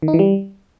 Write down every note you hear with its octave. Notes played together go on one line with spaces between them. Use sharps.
D#3
D#4
E3
G3